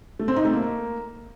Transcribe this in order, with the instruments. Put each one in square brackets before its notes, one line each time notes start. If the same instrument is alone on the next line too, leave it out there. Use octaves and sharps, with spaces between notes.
[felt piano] A3
C4
D#4
A3
A#3